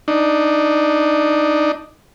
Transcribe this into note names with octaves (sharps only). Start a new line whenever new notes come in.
D4 D#4